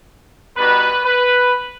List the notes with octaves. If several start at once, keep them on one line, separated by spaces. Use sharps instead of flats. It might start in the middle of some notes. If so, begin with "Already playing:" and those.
G3 B3 D#4 F#4 B4
B4